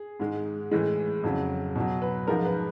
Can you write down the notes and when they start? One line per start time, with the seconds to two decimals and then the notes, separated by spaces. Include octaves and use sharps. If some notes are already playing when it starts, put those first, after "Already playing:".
Already playing: G#4
0.20 G#2 D#3 G#3
0.71 A2 E3 G#3
1.24 F2 C#3 F#3
1.75 B2 F#3
2.02 B4
2.27 G#2 F3 G#3 A#4
2.45 B4